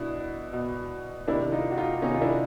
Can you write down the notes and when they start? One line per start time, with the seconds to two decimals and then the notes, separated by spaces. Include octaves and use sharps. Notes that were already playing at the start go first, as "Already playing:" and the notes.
Already playing: B2 D4 E4
0.53 B2
1.28 C3 D#3 D4 E4
1.52 D#4 F4
1.71 F#4
1.77 D#4 F4
2.02 C3 D#3 C#4 D#4
2.14 F4
2.21 D4 E4